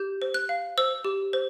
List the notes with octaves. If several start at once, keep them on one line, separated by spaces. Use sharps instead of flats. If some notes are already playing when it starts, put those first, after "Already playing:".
Already playing: G4 G6
C5
F#6
F5
C5 E6
G4
C5